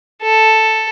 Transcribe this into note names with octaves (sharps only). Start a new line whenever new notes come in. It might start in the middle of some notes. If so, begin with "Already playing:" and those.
A4